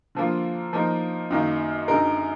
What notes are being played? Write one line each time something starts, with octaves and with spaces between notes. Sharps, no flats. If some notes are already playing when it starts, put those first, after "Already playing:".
D3 F3 A#3 F4
F3 A#3 D#4 A#4
F#2 D#3 A#3 D#4
F#2 D3 G#3 D#4 A#4